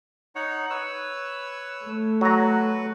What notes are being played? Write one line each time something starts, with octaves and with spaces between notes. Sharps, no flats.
D#4 C#5 F#5
B4 C#5 E6
A3
F#3 F#4 B4 A#5